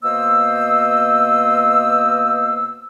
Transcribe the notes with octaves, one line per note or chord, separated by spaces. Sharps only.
B2 A#3 C5 D#5 E6